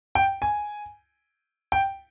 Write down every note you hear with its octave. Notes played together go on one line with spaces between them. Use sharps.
G5
G#5
G5